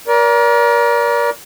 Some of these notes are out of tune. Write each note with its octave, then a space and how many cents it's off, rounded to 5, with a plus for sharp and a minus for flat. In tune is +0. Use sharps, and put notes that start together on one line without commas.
A#4 +30 D5 -30